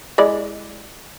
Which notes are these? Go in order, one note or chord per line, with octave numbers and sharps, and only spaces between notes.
G#3 E4 D5